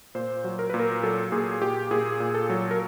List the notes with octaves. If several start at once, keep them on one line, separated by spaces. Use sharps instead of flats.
A#2 C5
F#3
A#4
A#2 B4
A#4
F#3 A4
A#2 G#4
A#2 G4
A#2 G#4
A#2
A4
F#3
A#4